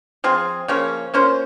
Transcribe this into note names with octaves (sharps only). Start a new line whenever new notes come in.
F3 C4 F4 G#4
C#3 F3 A#3 C#4
A#3 C#4 F4 C5